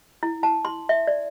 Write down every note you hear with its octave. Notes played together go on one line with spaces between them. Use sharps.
E4
A5
C6
E5
D5